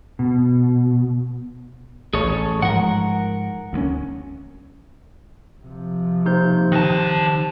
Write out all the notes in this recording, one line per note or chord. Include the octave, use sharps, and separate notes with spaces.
B2
A1 G#4 A4 C#5
G#2 F3 G#3 A#4 F#5
D2 G#3 C#4
C3 F3
A#3 D#4 G4 C5 G6
D#3 A5 F#6 A#6